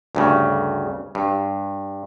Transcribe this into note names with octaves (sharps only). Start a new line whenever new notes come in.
D2 G2 C#3
G2